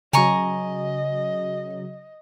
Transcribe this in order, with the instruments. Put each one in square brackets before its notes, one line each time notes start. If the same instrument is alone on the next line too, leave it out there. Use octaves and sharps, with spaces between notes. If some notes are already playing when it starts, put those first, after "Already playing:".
[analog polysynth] C#3 F#3 [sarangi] D#5 [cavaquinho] G#5 A#5 C#6